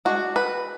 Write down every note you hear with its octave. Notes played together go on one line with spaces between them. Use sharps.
G#3 D4 F#4
B4